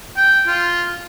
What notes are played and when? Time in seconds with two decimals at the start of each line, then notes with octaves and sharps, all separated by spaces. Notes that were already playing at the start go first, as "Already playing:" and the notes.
0.17 G5
0.47 F4